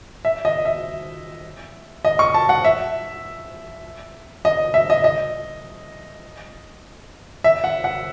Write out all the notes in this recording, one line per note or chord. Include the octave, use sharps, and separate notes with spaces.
E5
D#5
E5
D#5
C#6
A5
F#5
E5
D#5
E5
D#5
D#5
E5
F#5
F#5